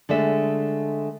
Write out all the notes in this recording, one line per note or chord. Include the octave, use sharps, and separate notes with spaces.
D3 G#3 A3 E5